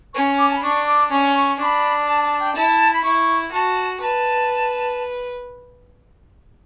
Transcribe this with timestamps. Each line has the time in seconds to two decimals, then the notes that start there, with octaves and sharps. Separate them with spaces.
0.14 C#4 C#6
0.38 D6
0.48 A5
0.55 B5
0.62 D4 C#6
0.86 D6
1.11 C#4 C#6
1.35 C#6
1.59 D4 C#6
1.63 B5
2.07 A5
2.23 A5
2.40 G5
2.55 E4 A5
2.93 B5
3.03 E4 C#6
3.52 F#4 A5
4.00 B4 A5